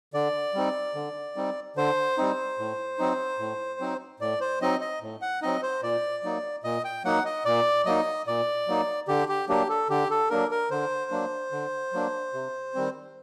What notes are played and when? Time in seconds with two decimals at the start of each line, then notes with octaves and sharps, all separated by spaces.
0.14 D3 D5
0.54 G3 C4 D#4
0.95 D3
1.36 G3 C4 D#4
1.76 D3 C5
2.18 G3 C4 D#4
2.59 A2
2.99 F#3 C4 D#4
3.39 A2
3.80 F#3 C4 D#4
4.20 A2 D5
4.41 C5
4.61 F#3 C4 D#4 D#5
4.81 D#5
5.02 A2
5.22 F#5
5.42 F#3 C4 D#4 D#5
5.63 C5
5.83 A#2 D5
6.23 F#3 A#3 D#4
6.64 A#2 D#5
6.85 G5
7.04 F#3 A#3 D#4 F#5
7.25 D#5
7.45 A#2 D5
7.86 F#3 A#3 D#4 D#5
8.27 A#2 D5
8.68 F#3 A#3 D#4
9.08 D3 G4
9.29 G4
9.49 F#3 A#3 D4 G4
9.69 A4
9.90 D3 G4
10.10 A4
10.30 F#3 A#3 D4 A#4
10.51 A#4
10.71 D3 C5
11.11 F#3 A#3 D4
11.52 D3
11.93 F#3 A#3 D4
12.33 C3
12.75 D#3 G3 C4